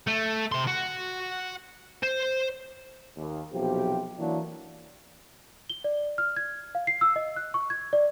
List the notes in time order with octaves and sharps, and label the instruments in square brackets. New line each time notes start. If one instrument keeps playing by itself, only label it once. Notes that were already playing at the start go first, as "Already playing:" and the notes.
[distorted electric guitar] A3
C3 C6
F#4
C5
[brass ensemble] D#2
B1 C3 F3 G4
E3 F#3 A#3 D4 E4
[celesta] G7
D5
F6
G#6
F5
C7
E6
D#5
F#6
C#6
G#6
D5